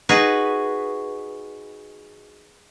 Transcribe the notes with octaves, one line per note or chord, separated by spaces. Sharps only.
D#4 F#4 G#4 B4